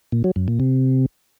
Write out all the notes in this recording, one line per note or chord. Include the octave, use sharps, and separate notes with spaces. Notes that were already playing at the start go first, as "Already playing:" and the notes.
A#2
F#3
F#2
A#2
C3